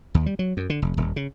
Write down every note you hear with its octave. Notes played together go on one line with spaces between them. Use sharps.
D#2
G3
F#3
F#2
D3
F1
D#1
C#3